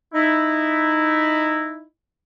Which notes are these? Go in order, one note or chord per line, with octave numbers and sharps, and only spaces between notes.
D#4 E4